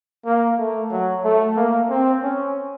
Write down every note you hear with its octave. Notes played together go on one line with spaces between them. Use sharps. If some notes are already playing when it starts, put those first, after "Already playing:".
A#3
A3
F#3
A3
A#3
C4
C#4